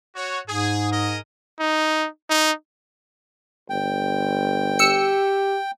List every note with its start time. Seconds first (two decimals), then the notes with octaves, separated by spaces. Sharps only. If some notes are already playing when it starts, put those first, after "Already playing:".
0.15 F#4 C#5
0.48 G#2 G#4
0.91 G#4 A#4 D#5
1.60 D#4
2.30 D#4
3.70 G1 G5
4.79 G4 E6 C#7